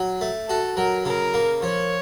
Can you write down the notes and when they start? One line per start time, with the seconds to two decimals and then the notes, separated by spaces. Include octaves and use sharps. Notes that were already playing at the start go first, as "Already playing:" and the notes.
Already playing: F#3
0.21 A3
0.48 F#4 A4
0.77 F#3 A#4
1.05 C#3 A#4
1.34 A#3
1.62 F3 C#5